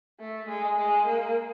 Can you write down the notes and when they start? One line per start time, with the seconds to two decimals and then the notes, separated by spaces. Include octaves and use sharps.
0.21 A3
0.49 G#3
0.78 G#3
1.07 A#3